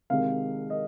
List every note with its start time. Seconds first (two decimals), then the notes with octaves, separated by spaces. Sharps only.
0.10 C2 C3 D#3 G#3 F5
0.70 D#5